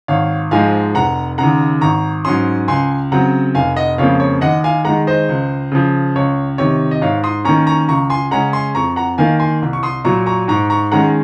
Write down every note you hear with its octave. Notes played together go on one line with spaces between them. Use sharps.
G#1 C#5 F5
G#2 F3 G#3 F5 G#5
F1 F#5 A#5
D#2 C#3 F#5 A#5
G#1 A#5 C#6
G#2 F#3 C#4 C6 D#6
C#2 G#5 C6
C#3 F#3 C4 F#5 A#5
F1 F5 G#5
D#5 F#5
F2 C#3 F3 A#3 C#5 F5
C#5
D#2 D#5 F#5
F5 G#5
D#3 G#3 F#5 A#5
C5 D#5
C#2
C#3 F3
C#2 C#5
C3 D#3 C#5
D#5
G#2 C#5 F5
C6 D#6
D#3 A#3 C#4 A#5 C#6
A#5 C#6
C#2 A#5 C#6
G#5 C6
C#3 G#3 C#4 F#5 A#5
G#5 C6
F2 A#5 C#6
F#5 A#5
D#3 A#3 F5 G#5
G#5 C6
C2
C#6
C6 D#6
A#2 F#3 A#5 C#6
A#5 C#6
G#2 A#5 C#6
A#5 C#6
D#3 G#3 C#4 F#5 A#5